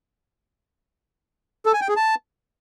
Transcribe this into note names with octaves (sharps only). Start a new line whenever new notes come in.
A4
G#5
G5
G#4
A5